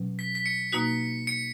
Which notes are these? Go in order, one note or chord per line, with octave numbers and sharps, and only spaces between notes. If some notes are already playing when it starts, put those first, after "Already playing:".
Already playing: B2 F#3 C#4
B6
B6
C#7
B2 A#3 D#4 F#4 B6
C#7